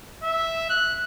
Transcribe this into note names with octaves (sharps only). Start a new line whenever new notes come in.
E5
F#6